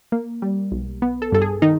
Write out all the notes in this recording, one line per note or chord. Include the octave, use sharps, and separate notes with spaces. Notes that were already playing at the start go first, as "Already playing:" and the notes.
A#3
G3
B1
B3
A4
G2 A4
G#4
D#3 D#4